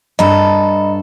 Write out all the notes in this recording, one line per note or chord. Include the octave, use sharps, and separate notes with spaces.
G2 A4 D#5 A#5 B5